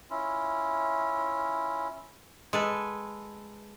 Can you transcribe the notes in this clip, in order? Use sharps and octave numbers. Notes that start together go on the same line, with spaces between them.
C#4 E4 F4
G#3 A4 B4